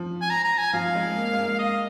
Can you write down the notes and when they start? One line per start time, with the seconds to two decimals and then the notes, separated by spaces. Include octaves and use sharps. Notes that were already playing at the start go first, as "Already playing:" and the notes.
Already playing: F3
0.22 G#5
0.30 A#5
0.44 A#5
0.58 G#5
0.73 F3 F5
0.95 G#3
1.16 A#3
1.33 G#3
1.38 A#3
1.59 D#5